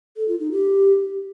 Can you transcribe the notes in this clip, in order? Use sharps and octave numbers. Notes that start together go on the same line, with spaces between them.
A4
F4
D#4
G4